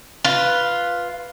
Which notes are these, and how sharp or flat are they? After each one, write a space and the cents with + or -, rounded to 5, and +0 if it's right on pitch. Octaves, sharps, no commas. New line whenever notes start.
F4 +0 B4 +0